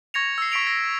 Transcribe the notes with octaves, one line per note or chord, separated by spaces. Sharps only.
C#6 G#6 A#6 C#7 F7
E6 C7
C#6 B6 D7 F7
A#6 C7